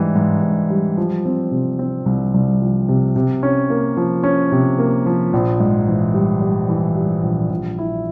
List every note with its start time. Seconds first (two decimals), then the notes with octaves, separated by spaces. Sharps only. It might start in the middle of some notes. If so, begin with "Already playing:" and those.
Already playing: G#2 E3 G3
0.15 G#2
0.43 G#2
0.70 G3
0.97 F3
1.25 C4
1.51 C3
1.79 C4
2.06 C2
2.34 C2
2.61 F3
2.89 C3
3.16 C3
3.43 C#4
3.70 A#3
3.97 F3
4.23 C#4
4.52 C3
4.78 A#3
5.06 F3
5.33 A#1
5.60 G#2
5.87 E3
6.14 G3
6.42 G3
6.69 E3
6.97 G3
7.23 A#1
7.50 A#1
7.78 E4